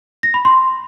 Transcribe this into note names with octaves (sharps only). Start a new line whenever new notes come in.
A#6
B5
C6